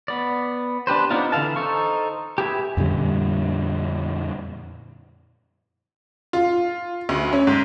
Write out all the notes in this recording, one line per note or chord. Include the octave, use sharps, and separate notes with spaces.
B3 D5
D4 G4 B4 C5
B3 C4 D4 D#4 F4
D3 E3 F5 A5
D#4 A4 C5 C#6
G4 G#4 B4 E5 G#5
F2 A#2 D3 G3
F4
D2
C#4
G#2